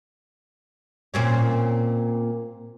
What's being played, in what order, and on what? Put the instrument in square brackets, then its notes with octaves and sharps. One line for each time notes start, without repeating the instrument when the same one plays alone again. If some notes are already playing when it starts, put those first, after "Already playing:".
[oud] A#2 C4 C#4